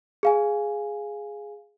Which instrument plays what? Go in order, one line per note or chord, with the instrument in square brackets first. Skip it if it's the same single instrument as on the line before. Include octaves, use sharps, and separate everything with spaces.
[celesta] G#4 F5 G#5